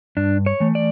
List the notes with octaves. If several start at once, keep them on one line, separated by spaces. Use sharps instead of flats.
G2 D4
C#5
E3 A3
D5